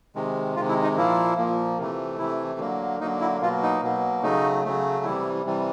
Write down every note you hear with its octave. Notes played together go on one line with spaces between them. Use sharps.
C3 D#3 G#3
C3 D#3 G#3 F4
E4
D#4
A#2 F3 A#3 E4
A#2 F3 A#3
C3 E3 A3
C3 E3 A3 E4
D3 F#3 A#3
D3 F#3 A#3 D#4
E4
B2 F#3 A#3 F4
D#4
B2 F#3 A#3
C#3 F#3 A3 D#4
C#3 F#3 A3
C3 E3 G3 E4
C3 E3 G3